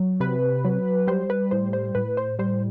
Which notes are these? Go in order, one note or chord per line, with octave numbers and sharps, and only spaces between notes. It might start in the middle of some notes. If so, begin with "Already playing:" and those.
Already playing: F#3
C3 B4
F#3
G3 C5
B4
A2 C5
C5
A2 B4
C5
G3 C5